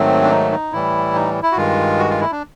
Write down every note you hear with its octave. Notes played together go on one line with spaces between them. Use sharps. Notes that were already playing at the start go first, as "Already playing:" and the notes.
Already playing: G#2 D#3 F#3 A3 C4
D4
D#4
D#4
A2 E3 G3 E4
D#4
E4
F#4
G2 D#3 G#3 F4
F#4
F4
E4
D4